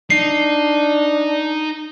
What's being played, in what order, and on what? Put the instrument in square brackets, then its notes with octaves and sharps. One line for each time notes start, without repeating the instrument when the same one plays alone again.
[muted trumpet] D4 [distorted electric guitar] D#4 [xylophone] C7